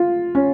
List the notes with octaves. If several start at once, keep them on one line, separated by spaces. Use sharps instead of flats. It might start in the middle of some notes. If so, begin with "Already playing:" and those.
Already playing: F4
C#4